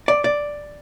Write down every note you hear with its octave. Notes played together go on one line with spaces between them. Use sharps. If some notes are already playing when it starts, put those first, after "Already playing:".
D5
D5